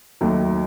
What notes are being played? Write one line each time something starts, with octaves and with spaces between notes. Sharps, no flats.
D#2 D#3 F#3 A3